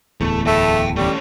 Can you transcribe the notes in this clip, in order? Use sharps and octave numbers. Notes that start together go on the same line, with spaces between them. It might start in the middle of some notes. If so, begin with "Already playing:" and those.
D1 E2 A3
A3 G5 A5
G3 A3 C#4